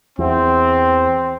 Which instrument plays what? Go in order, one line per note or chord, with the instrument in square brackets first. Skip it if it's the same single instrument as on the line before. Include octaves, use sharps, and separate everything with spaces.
[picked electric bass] E2 [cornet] C4